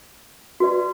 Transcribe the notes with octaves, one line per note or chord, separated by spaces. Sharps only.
F#4 B4 D5